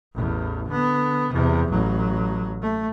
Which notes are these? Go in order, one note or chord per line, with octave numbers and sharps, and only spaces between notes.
A1 E2
D3 B3
E2 C3
A1 F#3
A3